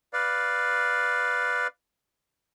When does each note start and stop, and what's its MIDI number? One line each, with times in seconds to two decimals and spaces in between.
0.13 1.67 71
0.13 1.67 74
0.13 1.67 77